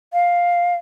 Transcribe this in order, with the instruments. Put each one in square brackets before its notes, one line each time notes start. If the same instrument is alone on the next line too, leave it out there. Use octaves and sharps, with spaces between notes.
[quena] F5